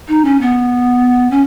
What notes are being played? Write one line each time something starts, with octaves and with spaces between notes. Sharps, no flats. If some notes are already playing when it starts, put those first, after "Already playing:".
D#4
C#4
B3
C#4